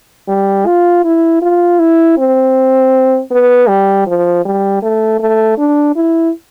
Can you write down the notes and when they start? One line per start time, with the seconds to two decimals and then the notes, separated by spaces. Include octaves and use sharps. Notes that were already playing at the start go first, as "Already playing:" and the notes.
0.29 G3
0.66 F4
1.05 E4
1.42 F4
1.79 E4
2.18 C4
3.31 B3
3.68 G3
4.07 F3
4.45 G3
4.83 A3
5.20 A3
5.58 D4
5.96 E4